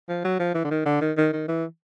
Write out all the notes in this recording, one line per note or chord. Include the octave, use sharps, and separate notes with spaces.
F3
F#3
F3
E3
D3
D#3
D3
D#3
D#3
D#3
E3